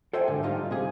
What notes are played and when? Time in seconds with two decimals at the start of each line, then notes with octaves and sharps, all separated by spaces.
0.13 A4 C5 D5 E5 G5 G#5
0.27 G#2 D3
0.43 G3 A3 D#4 F4
0.71 C3 G#4